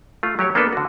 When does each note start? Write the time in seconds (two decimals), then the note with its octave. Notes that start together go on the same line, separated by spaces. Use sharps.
0.23 A3 F4
0.39 F#3 G4 C#5
0.55 A#3 B3 D4 A4 B4
0.73 D3 F#4